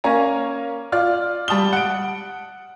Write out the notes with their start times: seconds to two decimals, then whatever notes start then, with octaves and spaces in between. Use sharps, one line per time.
0.04 A#3 C#4 C#5 G#5 A#5
0.92 F4 D5 F6
1.48 G3 A5 D#6 G7
1.73 F#5 D7